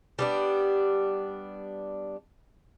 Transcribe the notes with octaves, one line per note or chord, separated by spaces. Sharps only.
G3 B3 D4